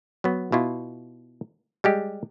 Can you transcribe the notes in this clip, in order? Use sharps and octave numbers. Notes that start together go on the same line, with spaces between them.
F#3 B3
B2 E4 F4
G3 G#3 G4